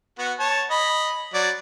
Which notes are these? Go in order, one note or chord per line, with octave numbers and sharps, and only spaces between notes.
B3 F#4
C#5 A5
D#5 B5
F#3 D5